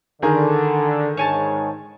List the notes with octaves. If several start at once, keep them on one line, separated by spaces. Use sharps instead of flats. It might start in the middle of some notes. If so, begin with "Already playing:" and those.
D3 D#3 G#4 A#4
G#2 C#5 G#5 A5